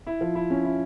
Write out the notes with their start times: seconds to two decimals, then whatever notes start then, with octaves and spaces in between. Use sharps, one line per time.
0.07 E4
0.21 F3
0.35 E4
0.50 C#4
0.64 E4